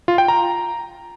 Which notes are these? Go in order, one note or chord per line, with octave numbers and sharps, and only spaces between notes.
F4
G5
A#5